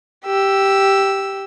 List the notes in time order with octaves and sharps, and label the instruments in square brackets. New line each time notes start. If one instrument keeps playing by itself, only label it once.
[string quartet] G4 E6